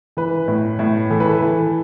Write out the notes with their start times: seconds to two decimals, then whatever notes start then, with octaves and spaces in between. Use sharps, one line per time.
0.17 E3 B4
0.48 A2
0.79 A2
1.11 E3 A4
1.20 B4
1.29 A4
1.42 E3